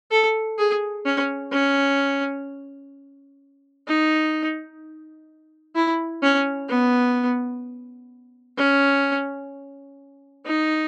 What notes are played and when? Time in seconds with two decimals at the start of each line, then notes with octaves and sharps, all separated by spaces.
0.11 A4
0.58 G#4
1.06 C#4
1.52 C#4
3.88 D#4
5.75 E4
6.23 C#4
6.69 B3
8.57 C#4
10.46 D#4